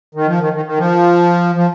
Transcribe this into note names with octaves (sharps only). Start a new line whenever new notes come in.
D#3
F3
D#3
D#3
D#3
F3
F3